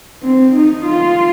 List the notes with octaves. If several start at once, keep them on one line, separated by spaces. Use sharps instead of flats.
C4
D#4
F4